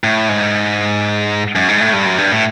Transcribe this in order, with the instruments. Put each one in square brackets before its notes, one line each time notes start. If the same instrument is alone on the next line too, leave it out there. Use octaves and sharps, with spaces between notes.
[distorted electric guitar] A2
G#2
F#2
G#2
A2
G2
F#2
G2
A2